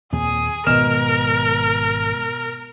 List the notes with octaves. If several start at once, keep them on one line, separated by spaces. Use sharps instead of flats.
D#2 A#2 C4 G#4
G#1 B2 A#4 F6 E7